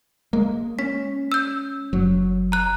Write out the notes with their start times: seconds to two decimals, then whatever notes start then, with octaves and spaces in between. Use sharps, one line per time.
0.33 G#3 A#3
0.79 C#4 B6
1.32 E6 G6
1.93 F#1 F#3
2.52 A#5 F#6